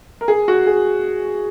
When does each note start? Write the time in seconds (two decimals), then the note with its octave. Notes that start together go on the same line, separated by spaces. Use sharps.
0.21 A#4
0.28 G#4
0.48 F#4
0.67 G#4